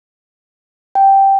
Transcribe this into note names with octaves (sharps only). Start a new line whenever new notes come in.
G5